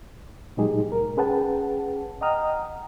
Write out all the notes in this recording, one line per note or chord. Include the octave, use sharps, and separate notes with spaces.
A#2 F#3 G#3 D#4 G4 G#4
C2 A#4
C#4 G#4 B4 F#5 G5 A5
D#5 F#5 G5 A#5 D#6 F6